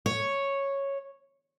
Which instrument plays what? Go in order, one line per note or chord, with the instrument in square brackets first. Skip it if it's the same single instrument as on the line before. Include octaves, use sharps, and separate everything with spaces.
[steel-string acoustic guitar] C#5